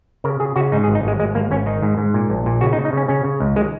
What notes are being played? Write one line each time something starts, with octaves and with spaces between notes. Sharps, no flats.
C#3 A#4
C#3 G#4
C#3 F#4
G#2 D#4
G#4
G#1
D#4
G#1 G#3
G#1 G#3
G#1 A#3
G#1 C#4
D#3 D#4
G#2
G#2
A#2
A#1
A#2
C#3 F#4
D#4
C#3
D#4
C#3 C#4
C#3 C#4
C#3
C#2
D#3 G#3